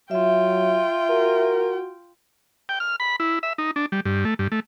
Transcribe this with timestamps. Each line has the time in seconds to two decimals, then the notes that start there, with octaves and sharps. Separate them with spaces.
0.11 F#3 F4 E5 G5
1.10 F#4 A#4
2.69 G5
2.80 F6
3.00 B5
3.20 E4
3.43 E5
3.58 D#4
3.76 D4
3.92 G3
4.05 G2
4.25 A3
4.39 G2
4.52 A3